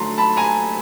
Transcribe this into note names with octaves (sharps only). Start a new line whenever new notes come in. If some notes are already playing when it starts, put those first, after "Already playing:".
Already playing: D3 F#3 A3 A#5 C6
A5 B5
G#5 A#5